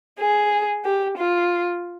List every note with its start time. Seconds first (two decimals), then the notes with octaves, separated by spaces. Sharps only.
0.19 G#4
0.84 G4
1.18 F4